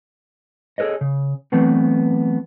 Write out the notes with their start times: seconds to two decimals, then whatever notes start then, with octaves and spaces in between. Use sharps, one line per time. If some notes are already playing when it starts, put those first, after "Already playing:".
0.78 G#4 A4 B4 C#5 D#5
1.01 C#3
1.52 E3 F#3 A3 B3 C4